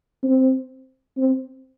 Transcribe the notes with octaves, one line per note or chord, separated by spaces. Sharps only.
C4
C4